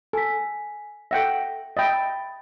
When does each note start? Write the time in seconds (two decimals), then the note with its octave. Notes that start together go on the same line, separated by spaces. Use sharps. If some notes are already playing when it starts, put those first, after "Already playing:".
0.13 A4 G#5 B6
1.11 A4 E5 F#5 G5 A#6
1.77 D#5 E5 G5 B5 A6